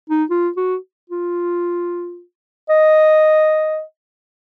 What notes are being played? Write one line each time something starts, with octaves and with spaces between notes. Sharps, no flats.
D#4
F4
F#4
F4
D#5